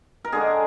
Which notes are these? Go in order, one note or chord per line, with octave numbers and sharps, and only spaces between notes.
A#4
D3 G#3 D4 G#4